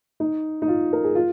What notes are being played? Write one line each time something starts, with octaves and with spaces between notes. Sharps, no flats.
D#4
D#4
F4
A#4
G#4
F4